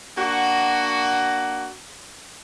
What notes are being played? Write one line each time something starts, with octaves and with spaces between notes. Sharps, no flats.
A#3 D4 F#4